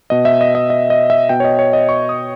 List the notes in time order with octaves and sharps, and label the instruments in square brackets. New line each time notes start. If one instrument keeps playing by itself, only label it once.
[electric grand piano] B2 D#5
E5
D#5
D#5
D#5
D#5
E5
B2 G5
C#5
D#5
C#5
D#5
C#6
D#6